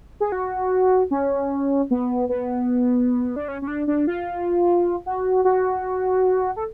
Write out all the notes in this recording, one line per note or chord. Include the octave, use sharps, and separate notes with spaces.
G#4
F#4
C#4
B3
B3
D4
C#4
C#4
D4
D4
F4
F#4
F#4
A4